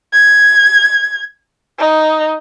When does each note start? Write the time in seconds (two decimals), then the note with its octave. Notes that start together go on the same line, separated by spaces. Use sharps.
0.13 G#6
1.78 D#4